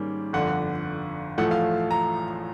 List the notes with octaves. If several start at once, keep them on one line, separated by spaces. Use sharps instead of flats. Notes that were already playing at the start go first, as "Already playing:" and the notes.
Already playing: G#2 D#3 G3 A#3 C#4
G1 F2 D3 F#5
A1 A2 F3 A3 F#5
F5
A#5